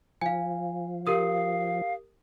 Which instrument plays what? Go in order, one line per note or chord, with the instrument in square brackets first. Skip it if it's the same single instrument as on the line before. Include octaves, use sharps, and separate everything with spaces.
[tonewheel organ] F3 [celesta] F5 G#5
[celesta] G4 A#4 D#6 [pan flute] F5